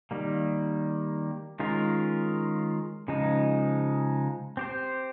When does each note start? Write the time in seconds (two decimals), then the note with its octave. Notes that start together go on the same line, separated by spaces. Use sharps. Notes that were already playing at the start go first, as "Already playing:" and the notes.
0.11 D#3 G3 A#3
1.60 D#3 G#3 C#4 F4 A#4
3.08 C#3 F3 G#3 D#4
4.57 C4 G4 C5